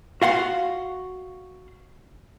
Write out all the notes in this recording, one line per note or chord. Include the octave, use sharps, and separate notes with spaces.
F#4 F5 F#5 C6